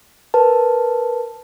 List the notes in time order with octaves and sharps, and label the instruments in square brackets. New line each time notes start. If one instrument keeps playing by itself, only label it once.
[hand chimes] A#4 B4 A5